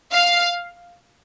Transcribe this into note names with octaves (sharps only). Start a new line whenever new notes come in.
F5